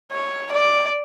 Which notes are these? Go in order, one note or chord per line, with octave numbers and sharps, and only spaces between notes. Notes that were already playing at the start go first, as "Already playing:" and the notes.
C#5
D5